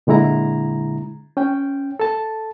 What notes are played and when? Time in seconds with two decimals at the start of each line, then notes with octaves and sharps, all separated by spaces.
0.07 A#2 D3 G#3 E4 A#5
1.37 C#4 G5
2.00 A4 A5